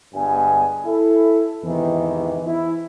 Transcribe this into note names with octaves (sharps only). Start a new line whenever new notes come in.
G1 G2 G#3 B3 G#5
E4 A4
E2 G#2 C3 D#3 E3
E4